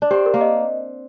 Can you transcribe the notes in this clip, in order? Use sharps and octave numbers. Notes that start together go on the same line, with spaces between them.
D4
C4 G4
A#4
A#3
D#5